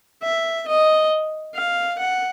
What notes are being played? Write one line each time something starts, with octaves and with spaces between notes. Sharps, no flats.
E5
D#5
F5
F#5